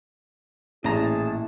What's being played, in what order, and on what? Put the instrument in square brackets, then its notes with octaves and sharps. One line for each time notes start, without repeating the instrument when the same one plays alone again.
[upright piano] A1 [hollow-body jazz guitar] A#2 A#5 [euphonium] E4 [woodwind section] G#4 A5